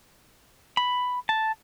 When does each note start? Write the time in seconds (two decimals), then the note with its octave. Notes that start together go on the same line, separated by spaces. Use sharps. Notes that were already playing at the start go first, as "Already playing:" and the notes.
0.77 B5
1.29 A5